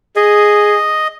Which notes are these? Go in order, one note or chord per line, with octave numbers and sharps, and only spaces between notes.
G#4 D#5